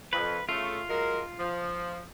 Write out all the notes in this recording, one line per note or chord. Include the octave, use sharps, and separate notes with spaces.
F2 B4
C#3 A3 F4
F#3 G#3 A#4
F3